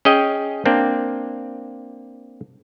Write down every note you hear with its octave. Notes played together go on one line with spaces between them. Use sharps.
C#4 G#4 D#5 G5
A#3 C4 D4